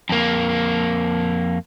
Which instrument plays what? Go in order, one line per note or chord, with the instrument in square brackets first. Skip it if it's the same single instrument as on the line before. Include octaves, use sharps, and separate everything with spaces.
[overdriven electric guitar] F2 A#3